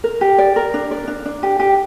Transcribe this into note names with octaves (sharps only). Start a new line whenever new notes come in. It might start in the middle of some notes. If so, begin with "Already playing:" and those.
A#4
G4
D5
A#4
D4
D5
D4
D4
G4
G4